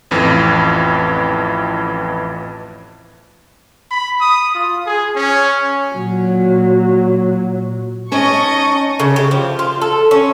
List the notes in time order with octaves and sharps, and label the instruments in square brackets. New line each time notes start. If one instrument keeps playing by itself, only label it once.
[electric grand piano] A1 F2 E3
[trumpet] B5
D#6
F4
G#4
C#4
[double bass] A#2 F#3
[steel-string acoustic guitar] C#4 [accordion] D#4 A5 [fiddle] D#5 [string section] C#6
[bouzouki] C#3
G4
F3
F4
A4
C#4